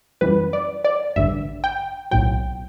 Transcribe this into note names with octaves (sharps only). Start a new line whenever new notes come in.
F#2 E3 G3 B4
D5
D5
A1 G2 D3 E5
G5
B1 A2 F#3 G5